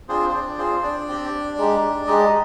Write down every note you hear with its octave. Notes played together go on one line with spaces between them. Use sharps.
C4 D4 F4 G#4 C5
C5
D4 D5
C4 F4 G#4 C5
D4 D5
C4 G4
G#3 D#4 G4
G#3 D#4 G4 D#5